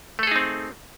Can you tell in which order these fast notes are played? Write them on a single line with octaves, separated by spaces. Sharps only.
A3 A4 G#4 D#4 C4